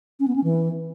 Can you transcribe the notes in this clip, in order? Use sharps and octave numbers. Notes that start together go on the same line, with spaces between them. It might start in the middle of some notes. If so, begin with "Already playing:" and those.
C#4
B3
C#4
E3